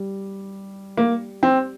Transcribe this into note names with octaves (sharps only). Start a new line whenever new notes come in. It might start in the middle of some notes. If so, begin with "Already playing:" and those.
Already playing: G3
A#3
C4